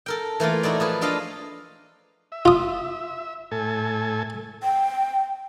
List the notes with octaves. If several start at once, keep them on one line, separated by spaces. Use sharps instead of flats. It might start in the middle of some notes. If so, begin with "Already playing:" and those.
A4 A#4 G5
E3 A3 A#3 F4
D#4 E4 F#4 D5
F3 G#4 B4
D4 F4 A4 D#5 F5
E5
F4 D#6
A2 A4 G#5
G5